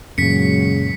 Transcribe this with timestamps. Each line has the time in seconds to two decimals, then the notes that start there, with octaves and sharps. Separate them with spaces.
0.18 F#2 A#2 C#3 F#3 G#3 B6 C#7